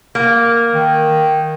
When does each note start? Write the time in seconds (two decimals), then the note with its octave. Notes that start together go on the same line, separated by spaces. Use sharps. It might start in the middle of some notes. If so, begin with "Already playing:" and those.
0.15 A#3
0.74 D#3